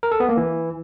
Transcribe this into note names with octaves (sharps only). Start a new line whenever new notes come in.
A#4
A4
B3
A#3
E3